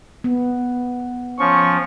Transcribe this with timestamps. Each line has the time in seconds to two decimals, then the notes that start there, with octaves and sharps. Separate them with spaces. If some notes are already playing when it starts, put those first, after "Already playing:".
0.24 B3
1.40 F3 C#4 C#6